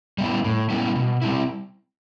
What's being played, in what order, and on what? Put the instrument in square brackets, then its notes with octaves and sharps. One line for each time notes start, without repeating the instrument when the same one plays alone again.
[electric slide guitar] G3 B3 E4
A2
G3 B3 E4
B2
G3 C4 E4